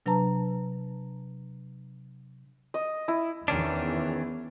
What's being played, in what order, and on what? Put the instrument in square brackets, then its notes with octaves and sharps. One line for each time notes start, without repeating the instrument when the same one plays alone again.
[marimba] C3 F#3 D4 B4 A5 A#5
[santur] D#5
E4
[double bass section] E2 E3 [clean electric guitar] D#3 C#4 D4